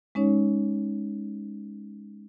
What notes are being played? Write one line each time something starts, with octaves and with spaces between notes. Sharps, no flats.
G#3 C#4 D#4 C#5